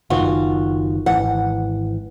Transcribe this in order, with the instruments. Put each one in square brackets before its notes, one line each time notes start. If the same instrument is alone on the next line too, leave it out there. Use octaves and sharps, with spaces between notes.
[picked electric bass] F#1 D#3 [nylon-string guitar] F4 F#4
[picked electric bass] G#1 E3 [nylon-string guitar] F#5